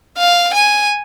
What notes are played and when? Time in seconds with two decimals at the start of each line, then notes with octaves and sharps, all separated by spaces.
0.18 F5
0.54 G#5